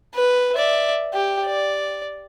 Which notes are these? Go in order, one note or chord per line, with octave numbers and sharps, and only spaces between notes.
B4
D5 E5
G4
D5